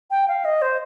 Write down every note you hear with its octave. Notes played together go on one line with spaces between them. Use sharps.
G5
F5
D#5
C5